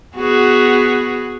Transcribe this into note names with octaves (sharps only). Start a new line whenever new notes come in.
B3 F#4 G#4